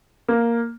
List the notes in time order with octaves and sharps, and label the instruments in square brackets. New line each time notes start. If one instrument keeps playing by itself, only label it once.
[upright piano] A#3